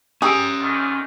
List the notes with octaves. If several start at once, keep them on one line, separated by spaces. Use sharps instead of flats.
C#4 G4 G#4 A#5 D#6 E6 D7
F#2 D3 D#3